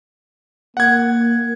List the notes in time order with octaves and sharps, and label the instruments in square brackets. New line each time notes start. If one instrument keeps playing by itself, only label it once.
[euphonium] A#3 [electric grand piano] F#5 G#6